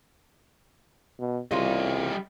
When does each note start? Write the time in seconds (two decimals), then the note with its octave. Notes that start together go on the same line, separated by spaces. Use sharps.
1.19 B2
1.51 C2 C#3 G3 F4 D#5